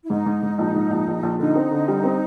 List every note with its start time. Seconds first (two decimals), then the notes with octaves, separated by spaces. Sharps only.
0.05 E4
0.10 G#2 D#4
0.26 G#2
0.43 G#2
0.58 A#1
0.74 G#2
0.91 A#1
1.07 A#1
1.23 A#1
1.39 D3 D#4
1.55 C4
1.71 D3
1.88 G3
2.04 C4